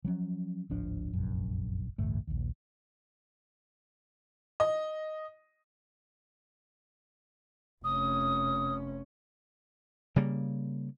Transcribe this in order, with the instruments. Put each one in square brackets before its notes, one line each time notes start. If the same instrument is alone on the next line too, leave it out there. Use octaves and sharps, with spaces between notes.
[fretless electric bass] F3 F#3 C#4
D1 G#1 F3 D4
F1 A#1 F#2
A1 D2 G2 A3
A#1 D#2
[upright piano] D#5
[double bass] F1 C#4 [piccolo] D#6
[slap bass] C#3 G3 A#3